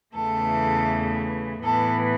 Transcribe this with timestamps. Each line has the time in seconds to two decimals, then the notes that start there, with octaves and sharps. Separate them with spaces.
0.16 E2 C#3 E3 A3 A4
1.63 A2 E3 B3 A4